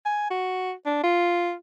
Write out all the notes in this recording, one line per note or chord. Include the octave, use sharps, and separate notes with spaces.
G#5
F#4
D4
F4